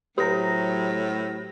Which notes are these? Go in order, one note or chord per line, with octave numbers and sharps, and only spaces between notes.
A2 F#3 G4 C5 A#5 A#6